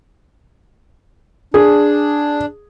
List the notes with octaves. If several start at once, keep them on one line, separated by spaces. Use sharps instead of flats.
D4 G#4